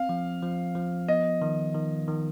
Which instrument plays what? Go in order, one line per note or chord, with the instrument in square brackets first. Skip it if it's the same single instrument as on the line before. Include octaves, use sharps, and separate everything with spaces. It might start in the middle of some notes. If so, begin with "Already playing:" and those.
Already playing: [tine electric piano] C4 [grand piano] F5
[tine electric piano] F3
F3
F3
[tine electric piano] B3 [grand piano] D#5
[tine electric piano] D#3
D#3
D#3